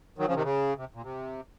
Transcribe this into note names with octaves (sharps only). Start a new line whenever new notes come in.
D#3 F#3
C#3 F3
C3 D#3
C#3
C3
A#2
C3